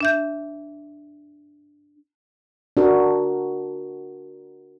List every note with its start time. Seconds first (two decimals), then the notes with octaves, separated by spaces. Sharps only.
0.01 D4 E5 G6
2.77 D4 F#4 A#4